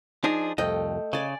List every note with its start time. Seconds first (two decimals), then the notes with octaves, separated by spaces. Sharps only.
0.24 F3 D4 D#4 G#4
0.58 C2 F2 A3 D#5 G5
1.13 C#3 D5 G#5